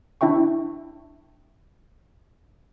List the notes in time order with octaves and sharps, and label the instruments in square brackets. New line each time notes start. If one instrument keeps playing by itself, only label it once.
[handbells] D4 E4 E5 G5 C#6